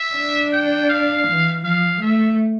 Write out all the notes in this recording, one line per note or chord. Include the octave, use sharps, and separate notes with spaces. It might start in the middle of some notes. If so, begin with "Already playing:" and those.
Already playing: E5
D4
G5
F5
E3
F3 F5
A3 E5